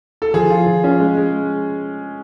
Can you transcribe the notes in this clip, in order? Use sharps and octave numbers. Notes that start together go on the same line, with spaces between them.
A4
F3 G#4
F4
F3
C#4
G#3
G#3